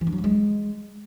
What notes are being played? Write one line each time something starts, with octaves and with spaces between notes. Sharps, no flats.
E3
D4
F#3
A#3
G#3